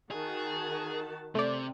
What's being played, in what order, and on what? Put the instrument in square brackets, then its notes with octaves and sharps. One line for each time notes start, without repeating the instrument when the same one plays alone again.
[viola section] D#3 F#4 A5 [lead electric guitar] G#4
[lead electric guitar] C3 [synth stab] A3 D5